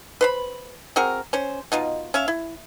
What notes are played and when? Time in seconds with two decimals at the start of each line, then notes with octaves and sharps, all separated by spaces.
0.21 B4 C5 B5
0.96 C4 F#4 G#4 A#4
1.33 C#4 C5
1.72 B2 D#4 F4
2.14 C#4 E5 F5
2.28 E4